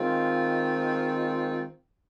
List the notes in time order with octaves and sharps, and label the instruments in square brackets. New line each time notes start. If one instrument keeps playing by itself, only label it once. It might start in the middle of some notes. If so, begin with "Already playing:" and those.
Already playing: [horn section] D#3 G#3 C4 F4